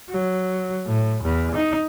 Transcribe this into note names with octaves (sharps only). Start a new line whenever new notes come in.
F#3
A2
E2
D#4